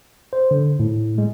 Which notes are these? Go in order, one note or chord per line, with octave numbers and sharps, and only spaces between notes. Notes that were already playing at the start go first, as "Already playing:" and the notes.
C5
D3
A2
G#3